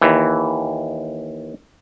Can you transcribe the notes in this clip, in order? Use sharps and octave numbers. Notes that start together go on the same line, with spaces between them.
D#2 E3